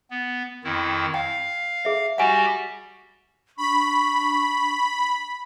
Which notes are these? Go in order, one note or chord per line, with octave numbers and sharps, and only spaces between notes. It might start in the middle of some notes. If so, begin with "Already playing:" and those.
B3
F2 D#3 E4
F5 G5
G#4 E5
G3 F#4 G4 F#5 G#5
D4 B5 C#6